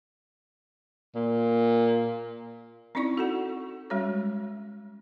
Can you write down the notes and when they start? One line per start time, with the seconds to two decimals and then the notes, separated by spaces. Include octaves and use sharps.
1.15 A#2
2.95 C4 C#4 D#4 E4 D5 C#6
3.17 F#4 A4 F#5
3.90 G3 G#3 C#4 F#4 C#5